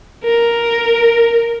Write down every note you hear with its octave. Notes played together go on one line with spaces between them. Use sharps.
A#4